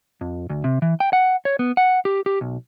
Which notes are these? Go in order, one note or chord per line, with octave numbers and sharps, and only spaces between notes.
F2
D2
C3
E3
G5
F#5
C#5
B3
F#5
G4
G4
B1